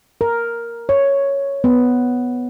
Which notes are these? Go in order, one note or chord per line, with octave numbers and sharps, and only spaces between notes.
A#4
C#5
B3